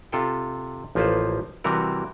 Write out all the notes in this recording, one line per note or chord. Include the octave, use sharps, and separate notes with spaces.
C3 F4 A4 G5
A1 F3 A#3 F4 B4 C5
C3 E3 G3 F#4 A#4